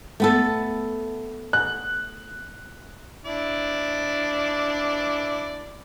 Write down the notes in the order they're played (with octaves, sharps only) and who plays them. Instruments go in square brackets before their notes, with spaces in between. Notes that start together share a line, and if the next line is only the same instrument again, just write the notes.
[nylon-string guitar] A3 B3 A4
[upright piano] F#6
[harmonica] D4 E4 D5